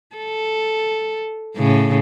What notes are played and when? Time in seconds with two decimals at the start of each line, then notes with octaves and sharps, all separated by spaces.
0.16 A4
1.56 A2 C#3